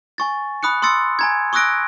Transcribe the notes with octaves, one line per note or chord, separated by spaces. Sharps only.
G#5 C#6 A6
B5 D#6 F#6 C#7
C6 D#6 E6 A6 C#7
G#5 A#5 G#6
C#6 D#6 E6 F#6 A#6 D7